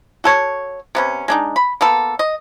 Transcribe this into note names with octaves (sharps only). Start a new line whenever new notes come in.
F#4 A4 C#5
C3 B3 C#4
G#3 D4 D#4
B5
A#3 B3 A4
D#5